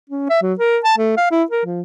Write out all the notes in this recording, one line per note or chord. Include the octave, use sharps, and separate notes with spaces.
C#4
E5
F#3
A#4
A5
A3
F5
E4
A#4
F3